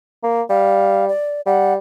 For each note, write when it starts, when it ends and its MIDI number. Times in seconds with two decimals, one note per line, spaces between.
0.23 0.42 58
0.50 1.09 55
0.50 1.05 77
1.09 1.41 74
1.46 1.77 55
1.46 1.73 78